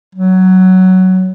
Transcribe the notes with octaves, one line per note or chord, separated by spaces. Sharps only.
F#3